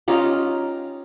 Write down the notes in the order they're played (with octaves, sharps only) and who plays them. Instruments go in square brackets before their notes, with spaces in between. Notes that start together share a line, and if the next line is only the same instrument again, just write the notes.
[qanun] C#4 D#4 F4 G4